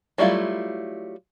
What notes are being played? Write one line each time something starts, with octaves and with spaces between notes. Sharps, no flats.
F#3 G3 A3 E4 F4